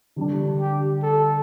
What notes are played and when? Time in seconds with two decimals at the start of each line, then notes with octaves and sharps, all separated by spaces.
0.16 D3 G3 D4
0.60 G4
1.03 A4